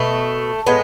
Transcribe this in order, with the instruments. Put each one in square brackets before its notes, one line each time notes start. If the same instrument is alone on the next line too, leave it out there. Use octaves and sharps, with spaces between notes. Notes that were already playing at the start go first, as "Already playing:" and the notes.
Already playing: [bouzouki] B2 A3
A2 G#3 B3